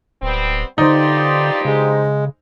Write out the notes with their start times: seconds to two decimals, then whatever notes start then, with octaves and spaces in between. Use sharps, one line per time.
0.22 D1 G3 B3 C4
0.78 G2 D3 D#4 F4 G4 C5 D5
1.65 C#3 G#3